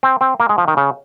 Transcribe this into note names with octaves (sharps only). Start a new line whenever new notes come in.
C4
C4
A#3
G#3
F3
D#3
C#3